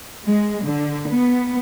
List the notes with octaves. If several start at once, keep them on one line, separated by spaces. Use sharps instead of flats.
G#3
D3
B3